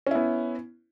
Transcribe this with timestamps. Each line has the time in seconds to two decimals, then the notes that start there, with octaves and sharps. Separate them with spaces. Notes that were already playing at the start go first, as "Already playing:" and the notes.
0.07 C#4
0.11 E4
0.15 B3